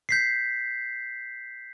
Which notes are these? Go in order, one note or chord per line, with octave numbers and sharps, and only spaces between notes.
G6 B6 C7